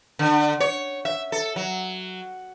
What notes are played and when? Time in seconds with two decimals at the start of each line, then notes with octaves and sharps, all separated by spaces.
0.19 D3
0.60 C#5
1.05 E5
1.32 A4
1.56 F#3